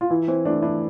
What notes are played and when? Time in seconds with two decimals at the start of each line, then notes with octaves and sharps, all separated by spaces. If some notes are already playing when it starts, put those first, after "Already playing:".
0.01 F4
0.10 E3 E4
0.28 E3 C4
0.45 A3 D4
0.62 D4 E4